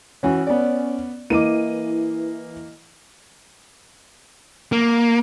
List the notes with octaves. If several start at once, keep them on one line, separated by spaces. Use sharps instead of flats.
E3 C#4 F#4
B3 D5
E3 A#3 D#5 D6 D#7
A#3